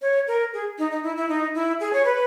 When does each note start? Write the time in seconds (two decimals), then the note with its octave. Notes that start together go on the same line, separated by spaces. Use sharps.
0.02 C#5
0.28 A#4
0.53 G#4
0.78 D#4
0.91 D#4
1.03 E4
1.17 E4
1.29 D#4
1.54 E4
1.80 G#4
1.93 C#5
2.05 B4